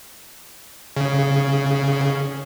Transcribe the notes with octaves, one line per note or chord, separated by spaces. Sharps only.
C#3